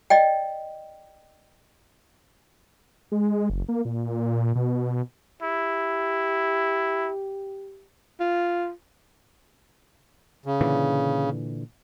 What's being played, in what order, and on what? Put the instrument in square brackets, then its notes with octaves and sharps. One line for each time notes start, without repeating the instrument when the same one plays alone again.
[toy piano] D5 D#5 G5
[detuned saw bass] G#3
F#1
A#3
A#2
B2
[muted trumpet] E4 [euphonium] G4
[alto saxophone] F4
[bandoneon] C#3
[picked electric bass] A#2 D3 E3